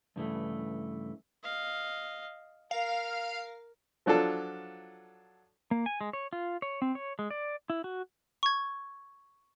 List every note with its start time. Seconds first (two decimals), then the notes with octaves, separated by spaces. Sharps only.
0.16 G2 C#3 E3 G3 A3
1.44 D#5 F5
2.71 A#4 F5
4.06 F3 F#3 D4 F4 A4
5.71 A#3
5.86 G#5
6.01 G#3
6.13 C#5
6.33 F4
6.62 C#5
6.82 C4
6.95 C#5
7.19 G#3
7.31 D5
7.70 E4
7.84 F#4
8.43 C#6 G#6